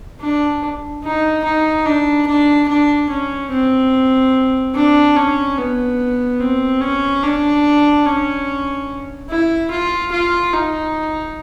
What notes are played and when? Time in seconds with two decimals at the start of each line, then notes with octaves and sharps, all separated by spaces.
0.21 D4
1.03 D#4
1.44 D#4
1.86 D4
2.27 D4
2.68 D4
3.10 C#4
3.51 C4
4.75 D4
5.16 C#4
5.57 B3
6.40 C4
6.81 C#4
7.23 D4
8.06 C#4
9.29 E4
9.71 F4
10.12 F4
10.53 D#4